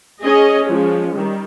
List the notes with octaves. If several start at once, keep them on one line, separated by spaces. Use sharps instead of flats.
C#4 G#4 D#5
F3 G#3 C#4
D#3 G3